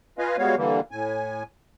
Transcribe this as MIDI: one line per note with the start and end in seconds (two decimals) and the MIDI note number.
0.18 0.37 65
0.18 0.37 71
0.18 0.37 75
0.18 0.37 77
0.18 0.37 80
0.38 0.55 55
0.38 0.55 56
0.38 0.55 59
0.38 0.55 66
0.38 0.55 73
0.38 0.55 77
0.56 0.80 50
0.56 0.80 52
0.56 0.80 55
0.56 0.80 58
0.91 1.43 45
0.91 1.43 80